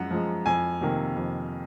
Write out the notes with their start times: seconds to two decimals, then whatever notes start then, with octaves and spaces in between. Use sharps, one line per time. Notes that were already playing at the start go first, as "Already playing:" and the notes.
Already playing: F#2 F3 G#3 F#5
0.11 F3 G#3
0.46 F2 G#5
0.81 C3 D#3 A#3
1.16 F2